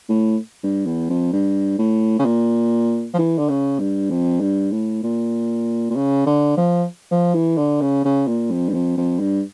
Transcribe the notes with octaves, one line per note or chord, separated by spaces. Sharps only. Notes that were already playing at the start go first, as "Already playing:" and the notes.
A2
G2
E2
F2
G2
A2
C#3
A#2
F3
E3
D3
C#3
G2
F2
G2
A2
A#2
A#2
C#3
D3
F3
F3
E3
D3
C#3
C#3
A#2
F2
G2
F2
F2
G2